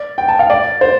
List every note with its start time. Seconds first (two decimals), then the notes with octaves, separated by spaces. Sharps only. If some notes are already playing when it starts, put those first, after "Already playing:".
Already playing: D5
0.18 G5
0.28 A5
0.39 F5
0.50 D5
0.81 C5